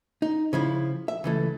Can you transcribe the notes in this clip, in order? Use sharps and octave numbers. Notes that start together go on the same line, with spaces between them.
D#4
C#3 F3 E4
E5
C#2 E3 A3